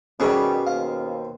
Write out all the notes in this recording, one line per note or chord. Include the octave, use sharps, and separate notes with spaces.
B2 D#3 G3 C#4 G#4 B4 C5 F#5
D#2 C5 F5